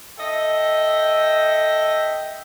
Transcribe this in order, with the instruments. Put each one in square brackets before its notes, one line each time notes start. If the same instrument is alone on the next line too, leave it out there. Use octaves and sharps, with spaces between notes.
[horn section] A4 D#5 E5 G5